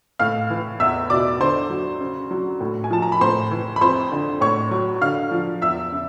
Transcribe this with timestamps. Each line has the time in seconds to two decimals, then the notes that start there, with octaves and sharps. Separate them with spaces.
0.19 A2 F5 F6
0.50 E3
0.80 E2 E5 E6
1.10 B2 D5 D6
1.40 D3 C5 C6
1.70 F#3
2.01 C#3
2.31 F#3
2.61 A2
2.84 G#5
2.91 F3 A5
3.02 A#5
3.12 B5
3.21 A2 C5 C6
3.51 E3
3.76 B5
3.81 F2 C5 C6
4.12 D3
4.41 A2 C#5 C#6
4.71 F#3
5.01 D3 F5 F6
5.31 F3
5.62 E2 E5 E6
5.92 C#3